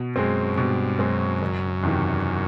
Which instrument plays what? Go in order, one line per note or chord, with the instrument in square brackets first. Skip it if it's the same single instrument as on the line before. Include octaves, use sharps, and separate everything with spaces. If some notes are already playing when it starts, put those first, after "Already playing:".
Already playing: [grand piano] B2
[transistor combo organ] F#2 [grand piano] G#3 C4
[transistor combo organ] G2 [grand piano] B2
[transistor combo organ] F#2 [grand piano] G#3 C4
[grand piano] F#1
E2 C3 D#3